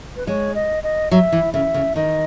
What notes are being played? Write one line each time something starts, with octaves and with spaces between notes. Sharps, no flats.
B4
G#3 C#5
D#5
D#5
F#3 E5
E3
C#3 E5
C#3
D#3 D#5